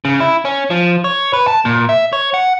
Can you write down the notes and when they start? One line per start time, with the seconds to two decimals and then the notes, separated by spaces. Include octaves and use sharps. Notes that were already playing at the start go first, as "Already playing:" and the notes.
0.05 C#3
0.20 E4
0.45 C#4
0.70 F3
1.04 C#5
1.33 B4
1.48 A5
1.65 A#2
1.89 E5
2.13 C#5
2.34 F#5